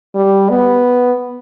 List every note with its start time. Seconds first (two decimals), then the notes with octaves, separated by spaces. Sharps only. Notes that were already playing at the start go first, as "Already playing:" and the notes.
0.16 G3
0.50 B3